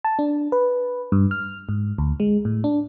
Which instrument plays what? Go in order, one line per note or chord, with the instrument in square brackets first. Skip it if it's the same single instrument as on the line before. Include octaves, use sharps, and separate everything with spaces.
[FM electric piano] A5
D4
B4
G2
F6
G#2
D2
G#3
A2
D4